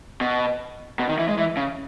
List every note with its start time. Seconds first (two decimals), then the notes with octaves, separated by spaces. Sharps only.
0.21 B2
0.99 B2
1.09 D#3
1.19 E3
1.29 G#3
1.38 E3
1.57 C#3